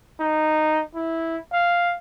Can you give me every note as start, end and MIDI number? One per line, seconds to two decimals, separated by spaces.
0.20 0.83 63
0.95 1.37 64
1.53 1.96 77